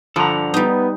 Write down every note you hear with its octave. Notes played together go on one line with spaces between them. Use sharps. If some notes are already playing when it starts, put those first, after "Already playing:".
G2 D3 F3 A4 F#5 A#5
G3 B3 D#4